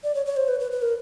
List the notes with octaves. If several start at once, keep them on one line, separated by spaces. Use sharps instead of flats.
D5
C#5
C#5
C5
B4
B4
B4
A#4